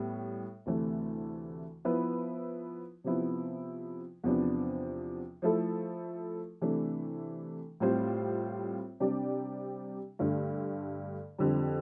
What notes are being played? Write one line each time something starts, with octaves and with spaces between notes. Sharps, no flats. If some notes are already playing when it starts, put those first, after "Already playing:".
Already playing: A2 G3 B3
D2 C3 E3 A3
F3 B3 E4 B4
C3 F3 B3 E4
E2 C3 F3 B3 D4
F3 A3 E4 A4
C3 E3 A3 D4
A2 G3 C4 F4 C5
C3 G3 D4 G4 D5
G2 D3 A3
F2 D3 G3